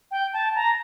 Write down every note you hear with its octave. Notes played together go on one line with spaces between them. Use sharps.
G5
A5
A#5